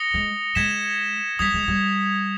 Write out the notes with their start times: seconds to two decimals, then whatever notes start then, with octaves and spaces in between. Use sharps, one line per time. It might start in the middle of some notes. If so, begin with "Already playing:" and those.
Already playing: D#6 A#6 C#7 G7
0.14 G#3
0.55 G#3 G#6 B6 E7
1.39 G3 D#6 G#6 B6
1.54 G#3
1.68 G3